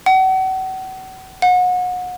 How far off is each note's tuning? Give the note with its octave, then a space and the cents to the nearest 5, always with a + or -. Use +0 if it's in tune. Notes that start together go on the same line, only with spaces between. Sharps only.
F#5 +35
F#5 -30